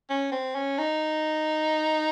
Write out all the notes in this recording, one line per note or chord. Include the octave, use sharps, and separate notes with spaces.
C#4
C4
C#4
D#4